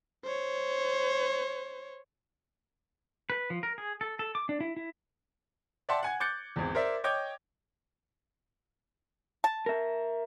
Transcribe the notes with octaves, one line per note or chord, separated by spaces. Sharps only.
C5 C#5
B4
F3
A#4
G#4
A4
A4
D6
D4
E4
E4
D5 E5 F#5 G5 A5 C6
F#5 G#5 G#6
D6 F#6 G6 A6 C#7
G#1 E2
A#4 C5 D5 E5
C#5 D#5 G5 D6 G6 G#6
A5
A#4 E5